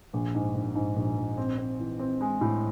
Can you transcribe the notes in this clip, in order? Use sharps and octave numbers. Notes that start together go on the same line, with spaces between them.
A#1
G#2
A#1
G#2
A#1
A#1
C4
C4
E3
C4
G#3
A2